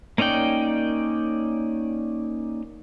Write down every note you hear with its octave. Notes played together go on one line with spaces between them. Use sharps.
A#3 C#4 D#4 D5 G5